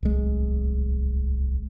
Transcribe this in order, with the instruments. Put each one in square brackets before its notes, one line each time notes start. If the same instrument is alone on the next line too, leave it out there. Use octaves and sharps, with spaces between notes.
[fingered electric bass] D1 G#3 [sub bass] C2